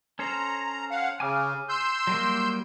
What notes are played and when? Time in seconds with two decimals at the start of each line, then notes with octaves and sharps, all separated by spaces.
0.19 C#4 A4 C5 A#5
0.91 F5 F#5
1.20 C#3 G#5 D6 F6
1.69 C6 E6 G6
2.07 F#3 G3 A#3